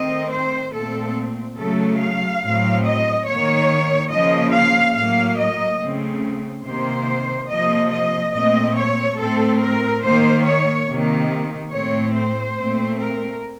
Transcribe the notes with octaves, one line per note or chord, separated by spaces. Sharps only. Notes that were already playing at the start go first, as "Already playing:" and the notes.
Already playing: D#3 A3 C4 D#5
C5
A#2 A3 C4 A4
C#3 F#3 A3 A4
F5
A2 F#3 C4
D#5
D#3 A#3 C#5
C#3 F3 A#3 D#5
F5
A2 F#3 A#3 F5
D#5
C#3 A3 C4
C3 D#3 A#3 C5
C3 F3 A#3 D#5
D#5
A#2 A3 C4 D#5
C#5
A2 A3 C4 A4
A#4
D#3 A#3 C5
C#5
C3 D#3 A#3
A2 A3 C4 C#5
C5
A#2 A3 C4
A#4